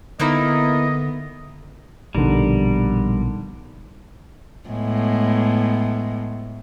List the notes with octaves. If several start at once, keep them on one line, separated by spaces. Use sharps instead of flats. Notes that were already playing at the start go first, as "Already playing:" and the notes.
D3 A#3 B3 D#4 E4 D#5
A#1 B2 D3 D#3 G3 A#4
A2 G#3 B3